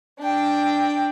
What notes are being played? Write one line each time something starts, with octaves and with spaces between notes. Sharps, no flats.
D4 G5